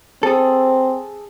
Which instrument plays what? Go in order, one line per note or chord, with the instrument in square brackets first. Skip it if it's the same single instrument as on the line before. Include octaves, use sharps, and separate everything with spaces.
[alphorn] C4 [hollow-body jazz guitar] G#4 A4